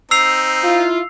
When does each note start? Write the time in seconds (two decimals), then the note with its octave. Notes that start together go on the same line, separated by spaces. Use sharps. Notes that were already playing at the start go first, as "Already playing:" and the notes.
0.11 C4 D#4 E6 C7 F7
0.64 E4 F4